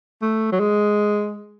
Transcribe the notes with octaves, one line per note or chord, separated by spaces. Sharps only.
A3
F#3
G#3